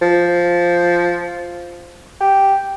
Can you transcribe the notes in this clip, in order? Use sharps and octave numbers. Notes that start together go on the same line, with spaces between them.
F3
G4